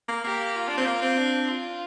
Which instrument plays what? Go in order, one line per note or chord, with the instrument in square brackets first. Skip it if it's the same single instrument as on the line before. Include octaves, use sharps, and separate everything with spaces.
[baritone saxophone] A#3
[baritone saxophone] A#3 [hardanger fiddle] G4
[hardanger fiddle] F4
[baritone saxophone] D4
C4
A#3
C4
[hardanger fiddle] D4
F4